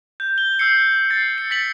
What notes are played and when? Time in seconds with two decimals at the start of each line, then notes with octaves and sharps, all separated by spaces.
0.20 G6
0.38 G7
0.59 E6 G6 C7 C#7
1.10 A6 C7
1.38 C#7
1.51 A6 B6 C#7 F#7